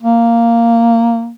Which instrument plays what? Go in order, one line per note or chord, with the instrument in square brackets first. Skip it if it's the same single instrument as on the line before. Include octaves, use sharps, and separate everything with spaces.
[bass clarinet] A#3